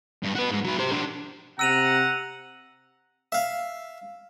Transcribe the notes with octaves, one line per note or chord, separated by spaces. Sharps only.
G2
F#4 B4
G#2
F#3 B4
G4 C5
D4 A#4
C3 F#5 A#5 E6 D#7 F7
E5 F5